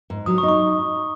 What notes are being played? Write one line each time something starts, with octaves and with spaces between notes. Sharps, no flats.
G#2
F#3 D#6
C#6
D#4
C#6